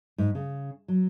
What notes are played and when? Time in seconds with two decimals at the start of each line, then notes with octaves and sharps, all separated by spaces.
0.18 G#2
0.35 C#3
0.88 F#3